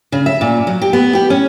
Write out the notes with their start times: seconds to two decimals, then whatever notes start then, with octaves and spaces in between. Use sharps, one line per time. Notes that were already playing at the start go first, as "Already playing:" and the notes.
0.12 C#3
0.26 E5
0.41 A#2
0.67 F#3
0.82 G4
0.93 B3
1.15 G4
1.30 C#4